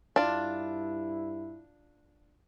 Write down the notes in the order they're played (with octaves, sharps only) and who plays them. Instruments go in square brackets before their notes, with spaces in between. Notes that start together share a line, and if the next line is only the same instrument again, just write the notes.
[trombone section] G2 E4 [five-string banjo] D4 F4